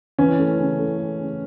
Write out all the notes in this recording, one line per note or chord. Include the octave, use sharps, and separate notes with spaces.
E3 C#4
A3
C#3
A3
A3
C#3